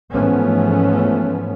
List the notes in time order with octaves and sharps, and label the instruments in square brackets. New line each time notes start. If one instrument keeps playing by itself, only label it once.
[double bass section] G#2 E3 F3 A3 B3 C#4